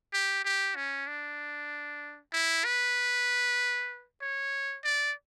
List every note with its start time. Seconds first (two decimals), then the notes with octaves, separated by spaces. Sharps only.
0.13 G4
0.45 G4
0.75 C#4
1.07 D4
2.33 E4
2.65 B4
4.21 C#5
4.84 D5